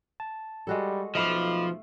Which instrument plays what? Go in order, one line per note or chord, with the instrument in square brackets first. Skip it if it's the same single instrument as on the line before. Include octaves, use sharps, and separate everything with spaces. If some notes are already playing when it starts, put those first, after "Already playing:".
[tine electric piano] A5
[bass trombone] G3 [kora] G#3 F#4 A4
[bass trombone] B1 [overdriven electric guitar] F3 [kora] A3 F5 [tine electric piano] D#5 B5 D6